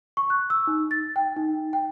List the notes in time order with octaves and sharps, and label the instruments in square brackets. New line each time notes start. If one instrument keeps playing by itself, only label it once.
[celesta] C#6
F#6
E6
D#4
A6
G5
D#4
G5